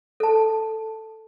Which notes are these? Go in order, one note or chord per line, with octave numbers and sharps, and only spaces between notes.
A4 A5